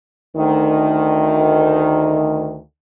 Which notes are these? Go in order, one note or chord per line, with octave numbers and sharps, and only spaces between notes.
D2 D#3